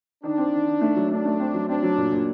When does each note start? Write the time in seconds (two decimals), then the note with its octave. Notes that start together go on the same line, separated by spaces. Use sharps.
0.24 D#3 D4
0.38 C4
0.53 D#3
0.67 D#3
0.81 A3
0.96 F#3
1.11 A3 D4
1.26 A3
1.40 C4
1.54 F#3
1.68 C4 D4
1.83 F#3
1.97 A#2
2.12 A#2